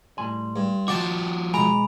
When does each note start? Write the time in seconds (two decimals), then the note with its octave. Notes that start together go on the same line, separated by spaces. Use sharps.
0.18 A2 G3 G#5 C6
0.56 G2
0.88 F3 F#4 D#5 F#5 G5 A5 D6
1.54 B2 G#3 G#5 A#5 B5